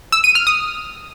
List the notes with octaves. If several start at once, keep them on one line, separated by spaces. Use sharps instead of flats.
E6
D#7
F6
D#6